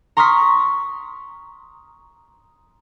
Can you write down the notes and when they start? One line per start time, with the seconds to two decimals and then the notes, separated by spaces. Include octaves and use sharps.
0.17 A#5 C6 C#6 D#6 F6 B6